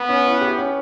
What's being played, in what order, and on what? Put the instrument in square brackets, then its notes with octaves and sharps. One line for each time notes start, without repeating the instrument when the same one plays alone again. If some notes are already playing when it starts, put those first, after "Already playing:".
Already playing: [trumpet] B3
[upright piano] C#4
E4
G4
C#4